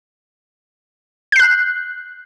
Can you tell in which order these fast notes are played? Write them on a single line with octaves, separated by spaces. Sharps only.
G6 C7 F#6